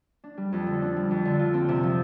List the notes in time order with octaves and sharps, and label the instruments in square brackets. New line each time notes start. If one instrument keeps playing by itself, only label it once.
[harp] D4
G3
F2
D3
D4
G3
F2
D3
F4
C4
C3
F3